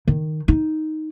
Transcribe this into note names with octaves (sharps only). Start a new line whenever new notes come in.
D#3
D#4